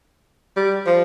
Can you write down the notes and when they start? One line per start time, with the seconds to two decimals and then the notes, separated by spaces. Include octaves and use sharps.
0.57 G3
0.86 F3